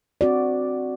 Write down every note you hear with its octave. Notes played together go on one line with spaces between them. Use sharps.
C4 F#4 D5